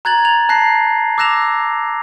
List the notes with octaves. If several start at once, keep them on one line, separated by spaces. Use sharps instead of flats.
A#5 F#6 G#6 A6 F#7
F7
A5 F#6 A#6 C7
D6 E6 F#6 A#6 E7 F7